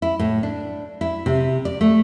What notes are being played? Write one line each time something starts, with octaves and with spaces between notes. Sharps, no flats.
E4
A2
D4
E4
C3
D5
A3